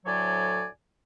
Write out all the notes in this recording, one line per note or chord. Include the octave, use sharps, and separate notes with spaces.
D2 A2 F#3 C#5 D5 G#5